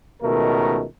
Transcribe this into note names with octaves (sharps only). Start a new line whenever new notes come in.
C#2 B2 D#3 A3 A#4